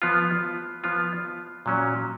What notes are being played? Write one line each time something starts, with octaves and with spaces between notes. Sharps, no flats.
F3 B3 F4
F3 B3 F4
A#2 F#3 C#4